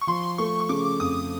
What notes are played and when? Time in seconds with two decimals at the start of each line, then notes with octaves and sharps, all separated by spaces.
0.01 C#6
0.07 F3 C6
0.38 A3 C#6
0.60 C#6
0.69 C#3 D6
1.00 F2 D#6